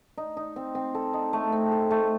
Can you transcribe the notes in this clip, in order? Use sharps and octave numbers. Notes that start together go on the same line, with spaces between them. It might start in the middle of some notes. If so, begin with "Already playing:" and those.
D#4
D#4
C4
C4
A4
D#4
A3
C4
A4
A3